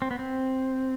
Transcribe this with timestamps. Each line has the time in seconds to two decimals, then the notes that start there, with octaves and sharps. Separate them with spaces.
0.02 C4
0.11 B3
0.19 C4